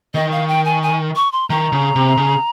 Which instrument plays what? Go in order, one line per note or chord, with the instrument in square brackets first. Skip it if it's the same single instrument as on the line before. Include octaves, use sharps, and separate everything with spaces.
[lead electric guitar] D#3 [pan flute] D#5
[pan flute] F5
G5
G#5
G#5
C#6
C6
[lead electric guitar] D#3 [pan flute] A#5
[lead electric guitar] C#3
C3
C#3